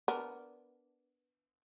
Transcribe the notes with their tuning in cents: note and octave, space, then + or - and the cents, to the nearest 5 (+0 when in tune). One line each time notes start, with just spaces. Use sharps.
B3 +0 D4 -10 A#4 +0